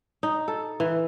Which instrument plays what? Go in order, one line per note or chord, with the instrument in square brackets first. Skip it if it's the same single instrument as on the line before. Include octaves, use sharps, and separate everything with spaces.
[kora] D#4
A4
E3